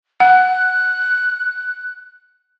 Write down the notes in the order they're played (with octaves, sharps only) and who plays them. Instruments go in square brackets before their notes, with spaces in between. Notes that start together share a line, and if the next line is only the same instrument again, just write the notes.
[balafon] F#5 [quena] F#6